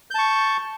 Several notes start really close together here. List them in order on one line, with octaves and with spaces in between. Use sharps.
G6 A5 C#6